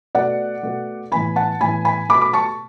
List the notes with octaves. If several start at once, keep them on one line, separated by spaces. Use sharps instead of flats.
B2 A3 D5 F#5
B2 A3
A2 E3 B3 G#5 B5
F#5 A5
A2 E3 B3 G#5 B5
G#5 B5
B2 A3 B5 D6
B5 D6
A5 C#6